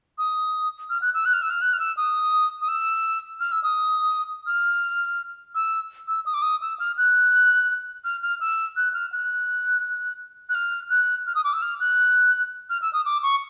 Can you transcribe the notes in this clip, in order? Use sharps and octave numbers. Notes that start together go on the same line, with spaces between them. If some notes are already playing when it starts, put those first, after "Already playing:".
D#6
F6
F#6
E6
F#6
F6
E6
F6
F#6
F6
E6
D#6
D#6
E6
F6
E6
D#6
F6
E6
E6
D#6
D6
D#6
E6
F6
F#6
F6
F6
E6
F#6
F6
F#6
F#6
F6
F#6
F6
D#6
D6
E6
F6
F#6
F6
E6
D#6
D6
C#6